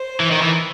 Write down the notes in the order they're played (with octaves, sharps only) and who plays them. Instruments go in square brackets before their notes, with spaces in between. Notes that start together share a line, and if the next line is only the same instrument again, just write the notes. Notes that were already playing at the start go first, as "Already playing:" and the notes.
Already playing: [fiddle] C5
[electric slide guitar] E3
D#3
E3